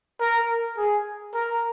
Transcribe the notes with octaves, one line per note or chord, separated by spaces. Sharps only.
A#4
G#4
A#4